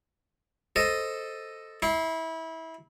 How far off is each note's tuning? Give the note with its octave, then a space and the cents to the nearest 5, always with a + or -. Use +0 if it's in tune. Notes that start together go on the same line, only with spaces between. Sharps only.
A4 +5 C5 +0 D#5 +0
E4 -25 C6 +0